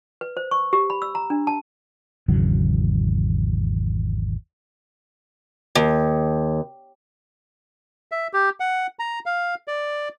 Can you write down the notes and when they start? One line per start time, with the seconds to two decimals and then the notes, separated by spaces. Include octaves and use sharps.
0.21 B4
0.37 C5
0.51 C#6
0.73 G4
0.90 B5
1.02 E6
1.15 A#5
1.30 D4
1.47 A5
2.28 G#1 E2 C#3 F#3
5.75 D#2
8.12 E5
8.33 G4
8.60 F#5
8.99 A#5
9.26 F5
9.68 D5